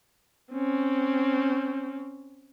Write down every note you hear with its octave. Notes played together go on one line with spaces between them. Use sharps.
C4 C#4